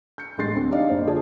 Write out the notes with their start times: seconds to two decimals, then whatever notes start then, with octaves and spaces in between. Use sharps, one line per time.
0.18 G6 C#7
0.38 A1 G3 G#3 C6 A6 C7
0.55 D2 C4 C5
0.70 D4 D#4 G4 D5 D#5 F5
0.89 F#1 C5
1.06 D3 F4 G#4 D5 A5